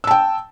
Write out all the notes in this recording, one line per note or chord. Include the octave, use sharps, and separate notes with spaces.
G5 A5 E6